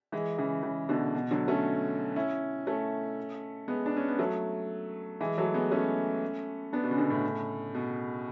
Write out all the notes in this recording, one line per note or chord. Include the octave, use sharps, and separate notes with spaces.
E3 G#3
C#3 E3
C#3 E3
B2 D3
B2
D3 F#3
A3 C#4
C#4 E4
A3 C#4
G#3 B3
D4
C#4
B3
F#3 A3
E3 G#3
F#3 A3
G#3 B3
A3 C#4
B3 D4
B2
C#3
B2 D3
A2 C#3
B2